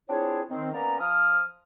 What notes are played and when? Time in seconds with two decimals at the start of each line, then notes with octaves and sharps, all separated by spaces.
0.10 C4 D4 E4 F4 G#4 C#5
0.51 D#3 C4
0.74 A#3 B3 C#4 D5 A#5
1.01 F3 D#6 F6